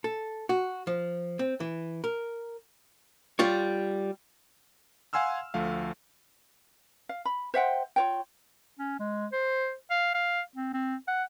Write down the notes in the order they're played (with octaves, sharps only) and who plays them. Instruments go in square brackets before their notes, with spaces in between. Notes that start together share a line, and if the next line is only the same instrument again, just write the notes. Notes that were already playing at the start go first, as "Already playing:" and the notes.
[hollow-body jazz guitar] A4
F#4
F3
C4
E3
A#4
G3 F4 C#5
[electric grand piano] F5 F#5 G#5 C6 E6 F6
D2 F3 A3 F5
[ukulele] F5
B5
C5 E5 F#5 G5
F4 C#5 G5
[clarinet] C#4
G#3
C5
F5
F5
C4
C4
F#5